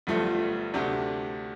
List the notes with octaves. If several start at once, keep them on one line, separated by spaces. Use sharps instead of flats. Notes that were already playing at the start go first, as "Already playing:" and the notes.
G1 G2 F3 A3
D2 C3 A3 D4